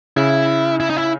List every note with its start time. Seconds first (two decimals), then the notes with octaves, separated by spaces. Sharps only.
0.17 C#3 E4
0.80 E4
0.90 D#4
0.97 E4